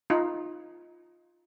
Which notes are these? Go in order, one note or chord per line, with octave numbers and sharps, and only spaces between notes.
D#4 F4